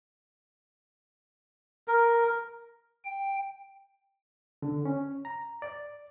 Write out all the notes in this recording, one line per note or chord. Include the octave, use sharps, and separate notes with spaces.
A#4
G5
D3
C#4
A#5
D5